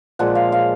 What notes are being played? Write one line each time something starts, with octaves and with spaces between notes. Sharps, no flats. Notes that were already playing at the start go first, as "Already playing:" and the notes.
A#2 F3 G#3 F#5
F5
F5